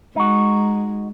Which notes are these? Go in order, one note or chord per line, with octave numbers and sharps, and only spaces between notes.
G#3 D#4 F#4